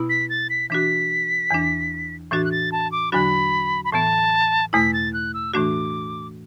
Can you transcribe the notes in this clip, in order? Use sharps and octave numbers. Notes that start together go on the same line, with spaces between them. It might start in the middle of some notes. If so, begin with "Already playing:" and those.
Already playing: B2 B3 E4
B6
A6
B6
E3 D4 F#4 B6
E2 E3 D4
A2 E3 D4 F#4 A6
F#6
A6
A5
D6
E2 D3 F#3 D4 F#4 B5
B5
A2 E3 B3 A5
E2 B2 A3 E4 B6
A6
F#6
E6
A2 E3 A3 D4 F#4 D6